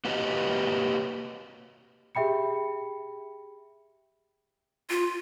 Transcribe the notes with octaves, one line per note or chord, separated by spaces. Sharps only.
A#3 F#4 G4 B4 C#5 D#5
G4 G#4 E5 G5 B5 C#7
F4